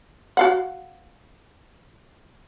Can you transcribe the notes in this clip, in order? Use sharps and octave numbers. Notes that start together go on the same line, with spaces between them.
F#4 F5 F#5